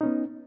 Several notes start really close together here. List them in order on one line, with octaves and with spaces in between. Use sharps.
D#4 C#4 B3